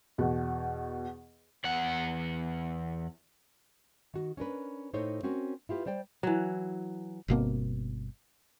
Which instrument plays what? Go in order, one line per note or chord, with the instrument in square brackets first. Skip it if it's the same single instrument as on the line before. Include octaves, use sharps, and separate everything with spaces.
[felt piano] E2 B2
[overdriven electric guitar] E2 F#5
[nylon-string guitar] D#3 F#4
C#4 D4 A#4 B4
A2 D#4 A4 C5 C#5
C4 C#4 F#4 A#4
E4 F4 G4 B4
G3 C5 D5 G5
[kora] E3 F#3
[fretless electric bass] G1 B2 A#3 C4